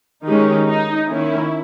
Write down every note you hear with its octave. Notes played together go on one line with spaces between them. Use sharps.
D#3 G#3 C#4 D#4 G4
D#4
D#3 A#3 C#4 E4